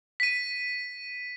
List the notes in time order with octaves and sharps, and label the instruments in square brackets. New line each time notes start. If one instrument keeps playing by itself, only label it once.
[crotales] B6 D#7